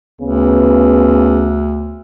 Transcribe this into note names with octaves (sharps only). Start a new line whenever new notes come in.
D2 C#3 B3